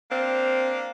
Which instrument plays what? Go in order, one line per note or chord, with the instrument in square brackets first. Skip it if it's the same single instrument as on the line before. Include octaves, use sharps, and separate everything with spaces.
[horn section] A#3 D4 F5 [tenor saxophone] C4